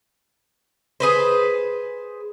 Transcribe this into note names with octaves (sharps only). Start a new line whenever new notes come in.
G#4 B4 C5